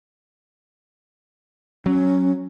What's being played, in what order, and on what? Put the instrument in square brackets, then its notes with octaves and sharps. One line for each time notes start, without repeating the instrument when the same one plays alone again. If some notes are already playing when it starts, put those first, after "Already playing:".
[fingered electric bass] F#3 [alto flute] C#4